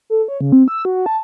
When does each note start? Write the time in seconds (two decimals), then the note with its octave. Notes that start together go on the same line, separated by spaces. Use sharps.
0.10 A4
0.28 C#5
0.41 C#3
0.52 C4
0.68 E6
0.85 F#4
1.06 A5